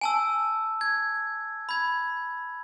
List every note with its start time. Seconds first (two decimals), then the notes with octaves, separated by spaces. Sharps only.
0.01 G#5 A5 E6
0.81 G#6
1.69 B5 G#6